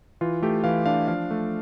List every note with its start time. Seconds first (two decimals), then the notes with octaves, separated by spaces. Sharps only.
0.21 E3 F4
0.42 A3 G4
0.64 E3 F5
0.86 D4 F5
1.08 F3 F5
1.31 A3